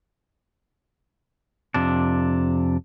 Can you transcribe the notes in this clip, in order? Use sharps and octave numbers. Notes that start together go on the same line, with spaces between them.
F2 C3 D4